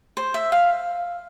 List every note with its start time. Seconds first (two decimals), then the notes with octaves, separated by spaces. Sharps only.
0.17 C5
0.34 E5
0.52 F5